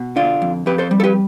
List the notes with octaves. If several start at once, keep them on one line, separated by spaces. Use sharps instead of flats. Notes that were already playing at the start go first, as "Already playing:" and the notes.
Already playing: B2
D3 D4 F4
F2
F2 G4 B4
A4 C5
G3
A4
G4 B4